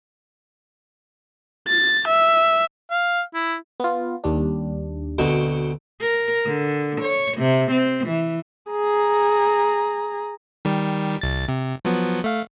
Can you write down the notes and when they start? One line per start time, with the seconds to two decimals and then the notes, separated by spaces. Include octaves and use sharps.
1.68 A6
2.07 E5
2.91 F5
3.34 E4
3.80 B3 F4
4.24 D#2 G3 D4
5.19 D2 B2 C4
6.01 A#4
6.46 D3
7.01 C#5
7.37 C3
7.71 C4
8.06 E3
8.70 G#4 A#5
10.65 D#3 G3 G4
11.21 C2 A6
11.49 C3
11.85 F3 F#3 B3
12.24 A3 F5